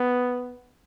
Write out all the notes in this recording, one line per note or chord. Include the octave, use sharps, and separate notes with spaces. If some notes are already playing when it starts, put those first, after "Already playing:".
Already playing: B3